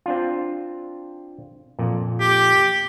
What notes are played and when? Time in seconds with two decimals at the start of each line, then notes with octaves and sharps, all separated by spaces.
0.06 C4 D4 F4
1.79 F2 A#2
2.20 G4